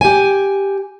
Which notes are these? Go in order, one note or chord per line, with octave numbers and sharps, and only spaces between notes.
G4 G#5